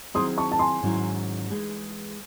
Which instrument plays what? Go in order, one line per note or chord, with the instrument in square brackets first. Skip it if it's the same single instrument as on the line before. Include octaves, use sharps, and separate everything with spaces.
[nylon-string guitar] D#3 F#3 C4 E4 G#4 [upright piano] C6 D#6
[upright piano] A5 C#6
A5
G#5 C6
[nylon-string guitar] G#2 D#3 F#3 C#4 E4
E3 G#3 D#4 G#4